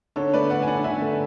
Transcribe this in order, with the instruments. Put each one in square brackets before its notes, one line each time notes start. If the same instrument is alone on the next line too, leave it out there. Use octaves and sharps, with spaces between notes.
[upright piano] D3 A4 C#5
A3 B4 D5
D4 D5 F#5
G#5
D3 D5 F#5
D3 E5 G#5
A3